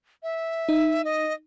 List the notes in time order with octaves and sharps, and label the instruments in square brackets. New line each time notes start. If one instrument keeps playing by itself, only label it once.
[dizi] E5
[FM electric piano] D#4
[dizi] D#5